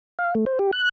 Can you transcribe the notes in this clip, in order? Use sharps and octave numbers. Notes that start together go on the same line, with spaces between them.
F5
A3
C5
G4
F#6